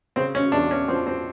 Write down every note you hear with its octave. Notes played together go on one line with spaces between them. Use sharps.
C#3 C4
C#4
E2 D4
C#4
F3 C4
C4